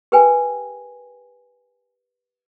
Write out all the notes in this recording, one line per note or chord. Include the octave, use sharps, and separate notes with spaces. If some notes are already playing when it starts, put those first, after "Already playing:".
G4 A#4 B4 G5 G#5